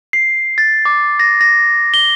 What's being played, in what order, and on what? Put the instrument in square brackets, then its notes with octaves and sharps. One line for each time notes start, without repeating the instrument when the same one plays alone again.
[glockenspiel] C7
A6
D6
A#6
A#6
G7